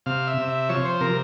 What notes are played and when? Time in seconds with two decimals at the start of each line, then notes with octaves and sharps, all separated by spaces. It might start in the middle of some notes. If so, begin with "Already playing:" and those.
0.06 C3 F5
0.27 E5
0.38 C3
0.48 E5
0.69 F3 C#5
0.85 C5
1.01 C3 A#4